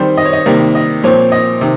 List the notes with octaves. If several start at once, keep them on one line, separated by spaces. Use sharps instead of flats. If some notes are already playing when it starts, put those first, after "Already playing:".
Already playing: D#3 G3 C4 C5
D#5
C#5
D#5
C3 D#3 G3 A#3
D#5
A#2 F3 C4 C#5
D#5
C3 D#3